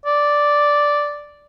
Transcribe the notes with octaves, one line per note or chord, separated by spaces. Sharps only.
D5